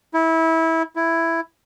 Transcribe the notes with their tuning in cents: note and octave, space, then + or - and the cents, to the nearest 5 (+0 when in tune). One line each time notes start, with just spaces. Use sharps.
E4 -20
E4 +5